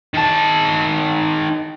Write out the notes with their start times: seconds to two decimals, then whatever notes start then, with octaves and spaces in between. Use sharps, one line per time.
0.14 D#3 A5